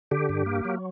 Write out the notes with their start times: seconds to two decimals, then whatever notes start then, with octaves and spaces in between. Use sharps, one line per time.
0.11 D3 G4
0.29 G2
0.46 A#3
0.65 F#3